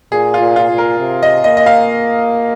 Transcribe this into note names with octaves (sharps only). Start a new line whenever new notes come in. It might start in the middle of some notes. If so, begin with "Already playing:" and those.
A#2 G#4
F4
A#2
F4
A#2
A#4
C3
D#5
A#3 D#5
D#5
F5